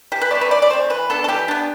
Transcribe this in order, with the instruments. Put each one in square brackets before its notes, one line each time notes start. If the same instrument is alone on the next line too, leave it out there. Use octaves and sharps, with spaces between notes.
[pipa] E3 G4
B4
A3 C4 D5
B4
E3 D5
D5
A3 C4 C5
E3 B4
B3 D4 A4
A4
E3 G4
B3 D4